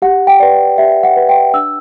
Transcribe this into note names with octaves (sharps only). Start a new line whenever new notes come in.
G4 F#5
G5
B4 D5
G4 E5
F#5
B4 D5
G5
D4 E6